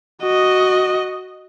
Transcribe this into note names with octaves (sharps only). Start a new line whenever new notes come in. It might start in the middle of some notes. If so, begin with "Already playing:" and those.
F#4 D#5